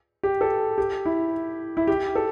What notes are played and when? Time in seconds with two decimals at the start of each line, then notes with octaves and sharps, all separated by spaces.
0.23 G4
0.41 A4
0.78 G4
1.05 E4
1.77 E4
1.87 G4
2.16 A4